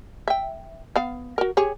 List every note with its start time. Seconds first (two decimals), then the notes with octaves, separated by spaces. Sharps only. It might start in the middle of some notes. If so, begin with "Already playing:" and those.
0.28 E5 G5
0.96 B3 F5
1.38 F#4 A#4
1.57 G4 G#4 C#5